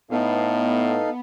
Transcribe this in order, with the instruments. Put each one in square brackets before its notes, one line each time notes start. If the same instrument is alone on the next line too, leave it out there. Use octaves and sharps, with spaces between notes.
[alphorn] A2 [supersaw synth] B3 [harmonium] D#4 A4 F5